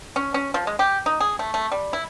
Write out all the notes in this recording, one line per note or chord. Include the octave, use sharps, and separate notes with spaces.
C#4
C#4
F3
G#3
G4
D#4
G#4
A3
A3
G3
E4